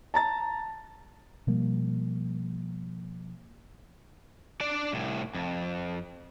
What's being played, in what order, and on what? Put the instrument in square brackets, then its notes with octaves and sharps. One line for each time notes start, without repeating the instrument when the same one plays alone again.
[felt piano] A5 A#5 A6
[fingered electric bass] B2 F3 G3 A#3
[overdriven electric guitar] D4 D5
C2 A2
F2